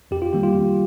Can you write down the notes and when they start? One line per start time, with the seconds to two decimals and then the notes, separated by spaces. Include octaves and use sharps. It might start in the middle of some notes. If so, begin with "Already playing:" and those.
0.11 F2 G4
0.22 F4
0.33 D#3 G3 A#3 G4
0.43 F4
0.54 F2